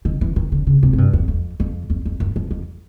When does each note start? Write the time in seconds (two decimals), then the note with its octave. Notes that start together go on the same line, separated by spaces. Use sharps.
0.05 D#3
0.21 E3
0.36 D#3
0.52 D3
0.67 C#3
0.83 C3
0.93 G#2
0.98 G2
1.13 F2
1.28 F2
1.60 F2
1.90 F2
2.05 F2
2.20 F#2
2.36 F2
2.51 F2